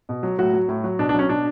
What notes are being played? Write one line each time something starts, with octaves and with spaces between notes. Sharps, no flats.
B2
F#3
A2 F#3 F#4
F#3
A2
F#3
B2 D4
D4
F#3 C#4
B2 D4